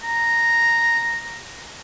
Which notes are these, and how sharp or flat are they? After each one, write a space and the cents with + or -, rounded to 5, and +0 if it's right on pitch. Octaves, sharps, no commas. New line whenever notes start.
A#5 -5